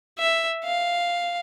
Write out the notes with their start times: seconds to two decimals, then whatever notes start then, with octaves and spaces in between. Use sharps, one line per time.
0.19 E5
0.64 F5